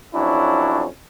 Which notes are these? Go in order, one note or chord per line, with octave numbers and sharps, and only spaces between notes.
F2 F#3 C#4 D4 E4